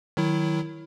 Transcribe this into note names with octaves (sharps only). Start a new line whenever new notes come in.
D#3 F#3 E4